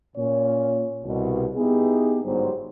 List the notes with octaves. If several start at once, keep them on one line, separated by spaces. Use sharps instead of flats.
A#2 C#4 C#5
C2 B2
B3 D#4 E4 G4 G#4
G1 G#2 F#3 G3 C5